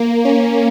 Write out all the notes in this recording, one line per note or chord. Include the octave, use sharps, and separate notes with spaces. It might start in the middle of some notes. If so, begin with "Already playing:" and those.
Already playing: A#3
C#4